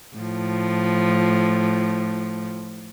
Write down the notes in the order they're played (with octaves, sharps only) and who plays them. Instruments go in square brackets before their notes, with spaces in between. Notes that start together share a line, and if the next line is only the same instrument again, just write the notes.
[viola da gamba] A2 F3